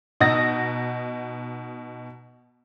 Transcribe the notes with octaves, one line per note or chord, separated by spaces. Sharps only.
B2 D#4 F#5 D#6 E6 A#6